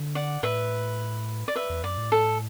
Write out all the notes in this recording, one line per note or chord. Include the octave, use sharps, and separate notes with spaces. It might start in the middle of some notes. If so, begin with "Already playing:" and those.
Already playing: D3
D5 F#5
A2 B4 E5
D5
B4 E5
E2
F#2 D5
A2
A4